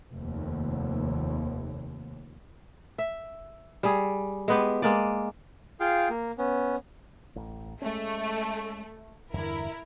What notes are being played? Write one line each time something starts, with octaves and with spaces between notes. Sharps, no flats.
F1 D#2
E5
G3 G#4
G#3 B3 G4
G#3 A#3 D5
F4 G#4 F5 G5
A#3
B3 C#4
A1
G#3 A3 C#4
E2 G2 D3 E4 A#4